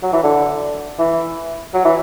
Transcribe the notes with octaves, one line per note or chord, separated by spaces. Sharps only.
F#3
E3
D3
E3
F#3
E3